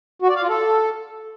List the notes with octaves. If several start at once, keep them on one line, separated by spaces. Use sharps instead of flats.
F#4
D5
F5
F4
A4